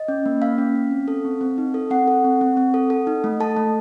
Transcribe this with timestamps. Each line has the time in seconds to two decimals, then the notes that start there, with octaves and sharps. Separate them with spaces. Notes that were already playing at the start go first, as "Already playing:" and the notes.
Already playing: D#5
0.08 C#4
0.26 A#3
0.42 A#3 F5
0.58 C#4
0.75 C#4
0.91 C4
1.08 A4
1.25 C4
1.41 C4
1.58 D#4
1.74 A4
1.90 C4 F#5
2.08 A4
2.24 C4
2.41 C4
2.57 C4
2.74 A4
2.90 A4
3.07 D#4
3.24 A3
3.40 A4 A5
3.57 A3